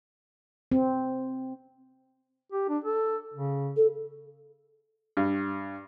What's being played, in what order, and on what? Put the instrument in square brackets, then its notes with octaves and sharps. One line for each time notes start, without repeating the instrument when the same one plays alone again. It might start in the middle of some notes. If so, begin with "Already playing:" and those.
[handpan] C4
[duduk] G4
D4
A4
C#3
[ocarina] A4
[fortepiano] G2